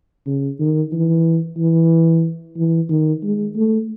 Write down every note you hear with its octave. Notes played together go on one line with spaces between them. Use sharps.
C#3
D#3
E3
E3
E3
D#3
G#3
A3